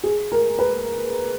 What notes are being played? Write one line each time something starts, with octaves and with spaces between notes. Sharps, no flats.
G#4
A#4
B4